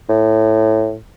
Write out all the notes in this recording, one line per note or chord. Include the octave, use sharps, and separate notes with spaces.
A2